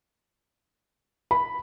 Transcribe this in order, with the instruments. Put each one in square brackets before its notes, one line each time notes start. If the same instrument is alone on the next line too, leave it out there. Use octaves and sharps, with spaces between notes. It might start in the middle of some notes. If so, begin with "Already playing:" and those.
[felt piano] B5